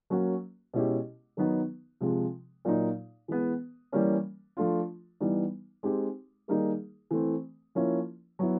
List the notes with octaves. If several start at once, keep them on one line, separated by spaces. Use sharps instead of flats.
F#3 A#3 C#4 F#4
B2 G#3 C#4 E4 G4
D#3 F#3 B3 D#4
C3 F3 G#3
A#2 F#3 A#3 D#4
E3 G#3 B3
E3 G3 A#3 C#4
F3 A3 D4 F4
E3 G3 B3 D#4
G#3 C4 D#4 G4
D#3 G3 A#3 D#4 G#4
E3 A3 C4
F3 A#3 C#4 E4
F#3 B3 E4